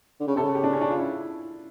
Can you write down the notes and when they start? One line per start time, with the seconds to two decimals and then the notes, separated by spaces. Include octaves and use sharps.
0.20 D3
0.27 C#3
0.36 C3 A4
0.43 C#3
0.55 G4
0.64 D4
0.73 C#4
0.81 D4
0.90 F4
0.99 E4